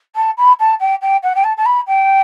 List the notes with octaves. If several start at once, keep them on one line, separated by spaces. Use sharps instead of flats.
A5
B5
A5
G5
G5
F#5
G5
A5
A5
B5
G5